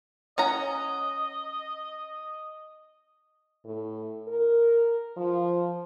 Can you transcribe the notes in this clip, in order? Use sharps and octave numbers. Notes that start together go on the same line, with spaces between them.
C#4 D#5 F#5 A#5
A2
A#4
F3